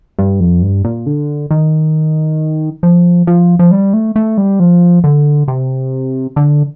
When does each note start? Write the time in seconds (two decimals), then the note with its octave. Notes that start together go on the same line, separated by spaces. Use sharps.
0.19 G2
0.40 F2
0.62 G2
0.85 A#2
1.06 D3
1.51 D#3
2.83 F3
3.27 F3
3.59 F3
3.71 G3
3.93 A3
4.16 A3
4.38 G3
4.60 F3
5.04 D3
5.48 C3
6.36 D3